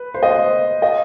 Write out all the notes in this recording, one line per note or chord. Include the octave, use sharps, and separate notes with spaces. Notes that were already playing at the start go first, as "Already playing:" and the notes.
Already playing: B4
C5
D#5
C5
D#5